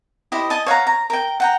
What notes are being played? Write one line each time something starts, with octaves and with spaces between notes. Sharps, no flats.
E4 G4 C5 D#5
D#5 G#5 A5
C#5 F5 F#5 A#5
A#5
A#4 G5
F#5 G5 A#5